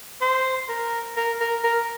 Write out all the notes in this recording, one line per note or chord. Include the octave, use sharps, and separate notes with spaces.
C5
A#4
A#4
A#4
A#4